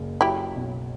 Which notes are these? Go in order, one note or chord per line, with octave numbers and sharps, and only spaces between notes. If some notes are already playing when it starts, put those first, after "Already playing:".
Already playing: F#1 C#3
F#3 E4 G4
B1